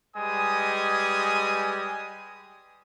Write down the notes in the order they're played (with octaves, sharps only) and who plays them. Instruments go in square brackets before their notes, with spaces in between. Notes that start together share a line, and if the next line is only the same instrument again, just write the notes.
[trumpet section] G3 G#3 B4 G#5 D#6